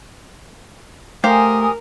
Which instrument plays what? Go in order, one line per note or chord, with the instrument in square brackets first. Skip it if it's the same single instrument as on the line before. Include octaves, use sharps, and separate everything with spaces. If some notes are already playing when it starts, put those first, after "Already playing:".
[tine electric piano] A3 [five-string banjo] G4 C5 F5 [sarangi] A#4 [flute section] G#5 D#6